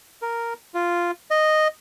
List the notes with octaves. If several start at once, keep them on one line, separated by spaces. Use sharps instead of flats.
A#4
F4
D#5